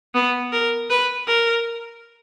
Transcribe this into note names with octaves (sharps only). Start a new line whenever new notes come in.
B3
A#4
B4
A#4